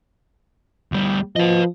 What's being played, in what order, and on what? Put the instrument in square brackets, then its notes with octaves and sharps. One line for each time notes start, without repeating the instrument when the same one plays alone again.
[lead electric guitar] D2 G3
[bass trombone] F3 [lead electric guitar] B4 D#5